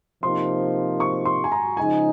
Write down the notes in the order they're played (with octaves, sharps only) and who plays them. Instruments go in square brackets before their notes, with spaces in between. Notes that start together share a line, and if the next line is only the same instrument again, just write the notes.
[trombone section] C3 F3 A#3 D#4 [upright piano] C6
[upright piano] C#6
C6
G#5
A#5
[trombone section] C#3 F3 G#3 D#4 [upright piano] G#5